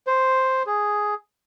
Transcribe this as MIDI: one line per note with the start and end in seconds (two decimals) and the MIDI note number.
0.07 0.63 72
0.66 1.14 68